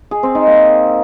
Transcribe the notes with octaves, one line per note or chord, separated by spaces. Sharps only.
G#4
C4
D#4
A#3